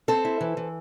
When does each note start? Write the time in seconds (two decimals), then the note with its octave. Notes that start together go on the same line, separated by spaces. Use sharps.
0.08 C4 A4 C5
0.25 E4
0.41 E3
0.57 E3